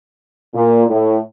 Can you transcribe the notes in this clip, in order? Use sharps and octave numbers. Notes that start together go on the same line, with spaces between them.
A#2
A2